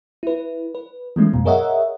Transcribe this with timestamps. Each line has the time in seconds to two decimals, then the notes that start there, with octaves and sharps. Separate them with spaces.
0.23 E4 B4
0.75 B4
1.16 E3 G#3 A3 C#4
1.34 F#2 B2
1.45 G#4 A#4 C#5 D#5 E5 F#5